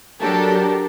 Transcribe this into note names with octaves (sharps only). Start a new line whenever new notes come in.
F#3 D4 G4 A4 A#4